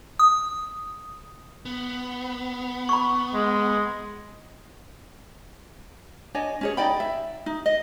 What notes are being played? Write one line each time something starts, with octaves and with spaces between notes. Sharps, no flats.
D#6
B3
B5 C#6
G#3
D4 C#5 D#5 G#5
C#4 G#4 C#5
D#4 D5 G5 B5
E5
D#4
D#5